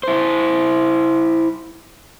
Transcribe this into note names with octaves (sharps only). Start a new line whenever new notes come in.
E4 C5